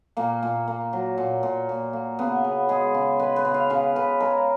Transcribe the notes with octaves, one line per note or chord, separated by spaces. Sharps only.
A#2 A#3
A#2
A#3
F#3
A#2
A#2
A#2
A#3
C#3 B3
C#3
G#3 G#4
C#3
G#3 B4
B4
C#3
F5
C#3 F5
C#3 B4
G#3 A#4